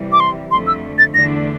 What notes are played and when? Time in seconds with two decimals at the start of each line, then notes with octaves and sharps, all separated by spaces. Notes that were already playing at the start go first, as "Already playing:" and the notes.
Already playing: C3 E3 G3
0.12 D6
0.20 C6
0.51 F2 D3 A3 C6
0.67 E6
0.98 A6
1.14 E2 D3 A3 D4 A#6